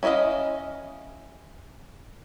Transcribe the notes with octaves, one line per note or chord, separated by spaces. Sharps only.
C#4 E4 C5 D#5 F5